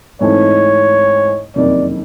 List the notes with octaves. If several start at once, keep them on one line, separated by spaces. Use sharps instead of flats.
G#2 E3 A3 C4 D#4 C#5
F#1 F2 C3 D#3 D5